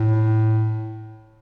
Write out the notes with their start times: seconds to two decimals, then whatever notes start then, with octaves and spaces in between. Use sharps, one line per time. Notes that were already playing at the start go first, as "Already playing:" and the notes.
Already playing: A2